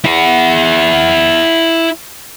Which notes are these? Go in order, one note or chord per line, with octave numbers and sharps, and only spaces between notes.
E4 F#5